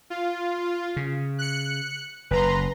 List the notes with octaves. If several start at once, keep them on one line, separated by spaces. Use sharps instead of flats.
F4
C#3
F#6 C#7
F#1 B4 A#5 C6